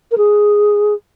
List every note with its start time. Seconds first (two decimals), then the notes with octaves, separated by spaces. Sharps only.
0.11 A#4
0.18 G#4